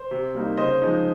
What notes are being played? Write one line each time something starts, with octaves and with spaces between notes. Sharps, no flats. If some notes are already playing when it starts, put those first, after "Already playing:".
Already playing: C5
C3
G3 A#3 D#4
C#3 C5 D#5
F3 G#3 D#4